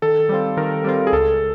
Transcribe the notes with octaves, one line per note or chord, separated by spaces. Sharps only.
D#3 A4
G3 C4 F4
D#3 A#4
G3 C4 F4
G#4
C#2 A4